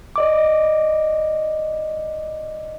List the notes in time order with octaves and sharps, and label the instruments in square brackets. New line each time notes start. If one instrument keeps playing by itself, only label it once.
[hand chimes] D5 D#5 D6